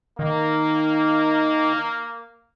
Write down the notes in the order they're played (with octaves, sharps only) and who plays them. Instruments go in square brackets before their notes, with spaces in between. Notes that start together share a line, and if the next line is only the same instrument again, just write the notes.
[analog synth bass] D#3 [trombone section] A#3